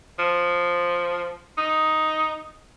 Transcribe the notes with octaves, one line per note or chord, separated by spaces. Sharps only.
F3
D#4